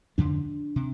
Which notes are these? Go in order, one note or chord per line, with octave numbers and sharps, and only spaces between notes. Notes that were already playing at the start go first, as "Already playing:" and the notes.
F2 D3 D4
C3